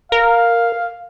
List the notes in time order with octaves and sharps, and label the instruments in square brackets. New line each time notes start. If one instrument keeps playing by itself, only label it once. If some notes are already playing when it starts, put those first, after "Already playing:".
[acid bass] A#4 [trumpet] F5